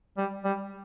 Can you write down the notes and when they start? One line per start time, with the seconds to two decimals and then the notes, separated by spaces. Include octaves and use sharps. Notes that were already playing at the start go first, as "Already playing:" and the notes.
0.17 G3
0.44 G3